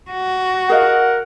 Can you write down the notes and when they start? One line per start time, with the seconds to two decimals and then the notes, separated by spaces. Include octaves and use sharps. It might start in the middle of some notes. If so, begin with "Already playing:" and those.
0.11 F#4
0.69 G#4 A#4 D#5 F5 F#5